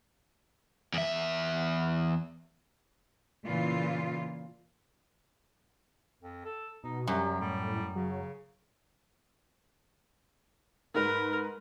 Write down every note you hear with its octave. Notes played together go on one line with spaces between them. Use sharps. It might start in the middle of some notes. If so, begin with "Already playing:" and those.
E2 E5
A#2 C#3 E3 F4
F2
A4
B2 D#4
F#2 C3 G3
A2 G3
C#3 F#3
G#2 A#4 B4